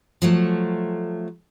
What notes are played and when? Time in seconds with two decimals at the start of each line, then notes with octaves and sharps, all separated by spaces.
0.22 F3 F#3 A3